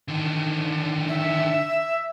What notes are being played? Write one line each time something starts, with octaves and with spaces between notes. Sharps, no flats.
D3 D#3
E5